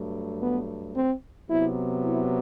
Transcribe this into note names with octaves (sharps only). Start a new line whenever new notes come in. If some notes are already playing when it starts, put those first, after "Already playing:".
Already playing: G2 F#3 A3
B3
C4
C3 F#3 B3 E4
E4